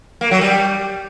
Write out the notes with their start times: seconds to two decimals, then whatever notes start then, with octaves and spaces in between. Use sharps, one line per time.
0.21 A#3
0.31 F#3
0.41 G3